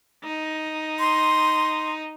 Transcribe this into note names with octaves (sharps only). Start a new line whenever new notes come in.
D#4
C6